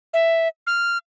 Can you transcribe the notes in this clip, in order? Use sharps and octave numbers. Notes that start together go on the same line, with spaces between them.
E5
F6